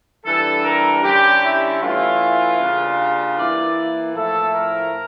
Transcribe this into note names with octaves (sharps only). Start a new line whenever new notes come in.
E3 G3 D4 A4
A#4
D3 G3 C#4 G4
E4
E3 A3 C#4 E4 F4
C#3 G3 A#3 D4
E3 A#3 E4 D5
A2 F3 A3 E4 A4
A#4